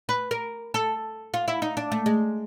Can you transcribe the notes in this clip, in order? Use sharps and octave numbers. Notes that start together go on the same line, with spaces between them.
B4
A#4
A4
F4
E4
D#4
D4
A3
G#3